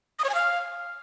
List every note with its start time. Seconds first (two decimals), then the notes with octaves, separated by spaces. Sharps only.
0.19 D#6
0.24 C#5
0.29 G#5
0.35 F5